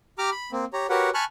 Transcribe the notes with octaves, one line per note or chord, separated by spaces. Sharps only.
G4 A#5 D6 F6
B5
A#3 C4
G4 C#5 A#5
F#4 G4 A#4 B4 C#5 F#5
G#5 A5 B5 C#6 F6 F#6